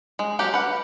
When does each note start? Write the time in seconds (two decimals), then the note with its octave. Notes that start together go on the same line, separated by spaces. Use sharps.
0.19 G#3
0.39 F#3 A#3 F#4 G4
0.54 B4 F5 F#5